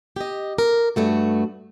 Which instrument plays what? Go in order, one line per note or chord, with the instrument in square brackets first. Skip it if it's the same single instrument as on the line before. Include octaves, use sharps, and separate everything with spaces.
[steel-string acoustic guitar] G4 D#5
A#4
G2 A3 F#4